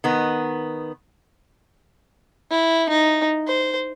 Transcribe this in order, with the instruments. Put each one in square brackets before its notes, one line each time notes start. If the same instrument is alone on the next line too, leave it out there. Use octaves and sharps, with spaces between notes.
[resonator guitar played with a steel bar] D#3 B3
[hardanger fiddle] E4
D#4
C5